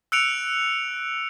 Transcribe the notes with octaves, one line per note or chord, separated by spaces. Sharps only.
E6 F#6 C#7 D7 F7